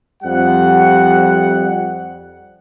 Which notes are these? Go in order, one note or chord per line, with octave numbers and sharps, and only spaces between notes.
F2 G3 F#5